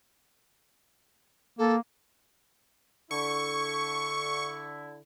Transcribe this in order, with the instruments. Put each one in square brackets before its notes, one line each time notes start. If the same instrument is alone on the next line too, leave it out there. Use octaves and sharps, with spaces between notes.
[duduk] A#3 [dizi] A4
[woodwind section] D3 E4 [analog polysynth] C#6